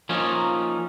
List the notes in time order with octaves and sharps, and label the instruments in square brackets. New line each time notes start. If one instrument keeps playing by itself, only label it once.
[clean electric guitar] F3 A#3 C#4 D#4